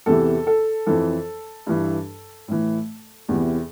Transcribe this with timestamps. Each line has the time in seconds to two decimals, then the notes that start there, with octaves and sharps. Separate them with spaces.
0.06 E2 C3 E3 A4
0.47 A4
0.86 F2 E3 A4
1.67 G2 E3
2.48 A2 E3
3.29 E2 C3 E3